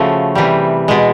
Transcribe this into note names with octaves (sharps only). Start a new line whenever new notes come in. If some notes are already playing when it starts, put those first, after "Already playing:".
Already playing: C#3 F3 A3 F#4
C3 E3 G3
B2 G#3